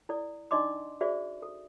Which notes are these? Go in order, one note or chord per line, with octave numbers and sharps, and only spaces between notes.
E4 A4 D5
D4 D#4 D5 D#5 C6 D6
F#4 G#4 C5 D5 E5
A4